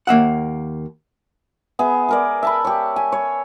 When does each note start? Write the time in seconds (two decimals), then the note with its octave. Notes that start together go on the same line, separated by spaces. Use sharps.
0.07 D#2 A#3 E5 F#5
1.79 B3 G#4 E5
2.09 G#4 A#4 D5
2.43 E5 A5 B5
2.65 G4 C#5
2.96 G#5
3.12 C#5